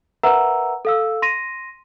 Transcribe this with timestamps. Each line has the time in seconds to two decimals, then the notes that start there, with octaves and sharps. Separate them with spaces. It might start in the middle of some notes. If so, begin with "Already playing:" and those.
0.23 A#4 B4 E5 F#5 A#5 E6
0.85 A4 F5 E6
1.22 C6 A#6 D#7